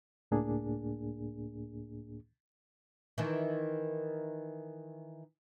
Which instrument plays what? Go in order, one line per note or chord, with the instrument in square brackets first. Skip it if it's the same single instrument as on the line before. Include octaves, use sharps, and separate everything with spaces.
[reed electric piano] C#2 A2 A#3 D4 G#4
[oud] D#3 E3